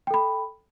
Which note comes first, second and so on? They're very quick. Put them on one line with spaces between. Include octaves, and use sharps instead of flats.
G5 A4 B5